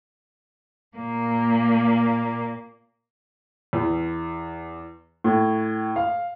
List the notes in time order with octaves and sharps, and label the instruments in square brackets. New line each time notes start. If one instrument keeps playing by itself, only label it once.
[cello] A#2 A#3
[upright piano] E2
A2
F5